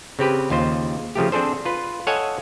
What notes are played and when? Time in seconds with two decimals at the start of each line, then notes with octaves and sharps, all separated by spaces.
0.19 C#3 C4 G4 B4
0.50 D#2 C#3 F4 C5
1.15 C#3 F3 A3 G4
1.32 C4 D4 G#4 A4 C5
1.65 F4 B4
2.07 A4 C#5 D#5 F5 F#5 G#5